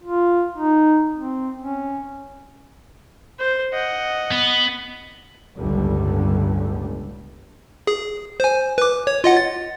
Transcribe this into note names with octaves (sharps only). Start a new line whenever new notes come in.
F4
D#4
C4
C#4
C5
D#5 F#5
B3
G1 C#2 A2 D3 G3
G#4
C5 G#5
B4 D6
C#5
F4 D#5 F#5
A6